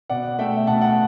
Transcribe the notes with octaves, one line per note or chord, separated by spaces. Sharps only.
B2 D5 F#5
A3 E5 G5
B2 F#5 A5
F#5 A5